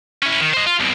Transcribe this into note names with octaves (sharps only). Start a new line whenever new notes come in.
C#4 E4
D#3
C5 D#5
F4
C2 B2